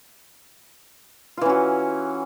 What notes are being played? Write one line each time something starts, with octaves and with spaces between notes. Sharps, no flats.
E3 C#4 F4 F#4